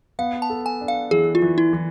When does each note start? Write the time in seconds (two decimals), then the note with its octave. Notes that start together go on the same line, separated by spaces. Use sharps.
0.19 B3 F5
0.42 A5
0.50 A4
0.66 G#5
0.81 D4
0.88 F5
1.11 E3 G#4
1.35 F4
1.42 E3
1.58 E4
1.73 E3